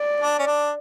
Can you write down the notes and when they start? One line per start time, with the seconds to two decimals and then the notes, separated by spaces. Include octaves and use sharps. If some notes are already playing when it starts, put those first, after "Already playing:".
Already playing: D5
0.20 D4
0.39 C#4
0.47 D4